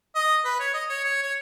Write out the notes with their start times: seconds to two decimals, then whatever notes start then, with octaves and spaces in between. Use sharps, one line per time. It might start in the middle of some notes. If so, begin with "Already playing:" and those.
0.15 D#5
0.45 B4
0.60 C#5
0.74 D#5
0.90 C#5
1.04 C#5
1.23 C#5